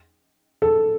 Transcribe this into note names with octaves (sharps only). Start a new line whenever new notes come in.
A4